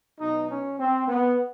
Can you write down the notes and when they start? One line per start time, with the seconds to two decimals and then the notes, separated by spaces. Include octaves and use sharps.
0.20 B2 F#3 D#4
0.50 C#4
0.79 C4
1.08 B3